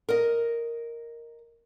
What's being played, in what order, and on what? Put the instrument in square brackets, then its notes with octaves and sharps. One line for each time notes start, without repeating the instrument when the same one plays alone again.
[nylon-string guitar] A#4 D#5